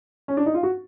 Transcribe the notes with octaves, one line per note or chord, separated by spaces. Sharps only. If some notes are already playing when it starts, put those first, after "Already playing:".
C#4
D4
D#4
F4
F#4